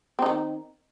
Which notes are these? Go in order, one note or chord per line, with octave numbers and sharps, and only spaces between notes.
D#3 C4 D#4